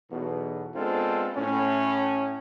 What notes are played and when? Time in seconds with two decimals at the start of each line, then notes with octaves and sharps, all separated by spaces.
0.11 B1 E2 B2
0.75 G#3 B3 C4 D4 F4 A4
1.36 A2 C#4